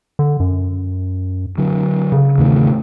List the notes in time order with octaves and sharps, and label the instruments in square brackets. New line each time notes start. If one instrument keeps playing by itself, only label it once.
[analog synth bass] D3
F#2
[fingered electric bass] D3 F#3
[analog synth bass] C#3
[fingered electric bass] E2 A2 D#3